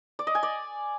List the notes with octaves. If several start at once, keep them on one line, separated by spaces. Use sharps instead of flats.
D5
D#5
G#5
D5